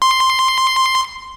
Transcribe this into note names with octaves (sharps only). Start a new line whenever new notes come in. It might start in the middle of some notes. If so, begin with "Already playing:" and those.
C6